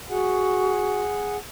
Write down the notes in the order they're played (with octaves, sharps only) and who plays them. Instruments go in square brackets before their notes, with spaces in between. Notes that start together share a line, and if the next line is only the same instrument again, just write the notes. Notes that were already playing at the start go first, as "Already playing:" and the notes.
[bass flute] F#4 [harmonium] G#4 F#5